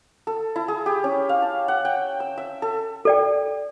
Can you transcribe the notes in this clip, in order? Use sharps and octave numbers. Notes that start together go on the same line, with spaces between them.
A4
E4
G#4
G4
C#4
F5
A5
F#5
G5
E6
E5
A4
A4 D5 G5